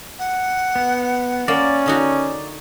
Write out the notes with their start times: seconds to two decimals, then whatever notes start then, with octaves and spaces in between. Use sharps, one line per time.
0.18 F#5
0.76 B3
1.48 A#3 C#4 D5
1.86 D3 D#4 F#4